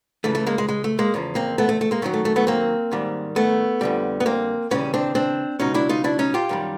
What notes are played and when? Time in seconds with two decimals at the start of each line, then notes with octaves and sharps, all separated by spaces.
0.24 C#2 C#3 E3 A3
0.35 A3
0.46 G#3 A#3
0.58 G#3
0.68 G#3
0.84 A3
0.99 G#3 A#3
1.14 E2 C#3 F3
1.35 A#3 C4
1.58 A3 B3
1.69 A3
1.81 A3
1.91 G#3 A#3
2.02 F#2 D#3 F#3 A3
2.14 A3
2.25 A3
2.36 A3 B3
2.47 A#3 C4
2.91 G#2 D#3 G3
3.36 A3 B3
3.81 F2 D3 G3
4.20 B3
4.26 A#3 C4
4.71 D#2 C#3 E3 G3 B3 C#4
4.94 C4 D4
5.15 C4 D4
5.59 C#2 B2 F#3 C#4 D#4
5.74 D4 E4
5.89 D#4 F4
6.04 D4 E4
6.19 C#4 D#4
6.34 F4 G4
6.49 F#2 D#3 G3